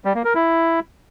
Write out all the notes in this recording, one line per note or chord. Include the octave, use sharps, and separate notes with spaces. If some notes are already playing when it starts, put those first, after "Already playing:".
G3
A#3
A#4
E4